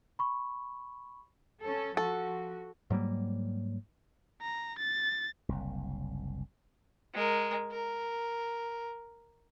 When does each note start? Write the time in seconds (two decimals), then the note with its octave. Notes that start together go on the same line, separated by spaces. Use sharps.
0.19 B5 C#6
1.61 C#4 A4
1.97 F3 F#4 A4
2.90 G#2 F#3 G3 A#3
4.42 A#5
4.79 A6
5.49 F#1 C2
7.14 G#3 A#4
7.71 A#4